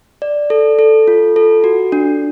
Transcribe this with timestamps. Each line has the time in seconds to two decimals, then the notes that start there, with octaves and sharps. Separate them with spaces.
0.22 D5
0.50 A4
0.79 A4
1.08 F4
1.36 A4
1.64 F#4
1.92 D4